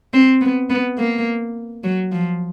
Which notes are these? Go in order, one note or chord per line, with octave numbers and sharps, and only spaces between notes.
C4
B3
B3
A#3
F#3
F3